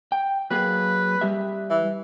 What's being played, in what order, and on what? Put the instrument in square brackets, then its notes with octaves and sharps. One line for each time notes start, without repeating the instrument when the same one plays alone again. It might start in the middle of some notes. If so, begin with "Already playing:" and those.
[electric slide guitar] G5
[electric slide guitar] F#3 A#3 G#4 [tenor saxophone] B4
[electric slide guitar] G3 G4 E5
[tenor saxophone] E3